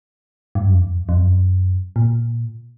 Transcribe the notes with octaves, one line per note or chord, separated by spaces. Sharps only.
G2
F#2
F2
E2
F2
F2
F#2
A#2